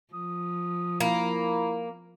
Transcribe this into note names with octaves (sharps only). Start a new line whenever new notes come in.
F3 D#6
A#3 E4